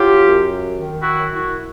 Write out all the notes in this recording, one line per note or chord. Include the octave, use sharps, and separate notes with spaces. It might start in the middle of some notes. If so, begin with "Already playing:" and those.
Already playing: F#3 F4 G4
F#2
D#3
E4 F#4
F#2
E4 F#4